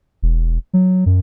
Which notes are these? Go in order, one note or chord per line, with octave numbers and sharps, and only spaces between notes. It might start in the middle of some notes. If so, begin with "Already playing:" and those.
E1
F#3
F#2